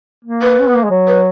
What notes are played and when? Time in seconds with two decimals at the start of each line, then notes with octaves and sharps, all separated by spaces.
0.25 A#3
0.42 B4
0.60 C#4
0.67 B3
0.75 A#3
0.84 G#3
0.90 F#3
1.08 B4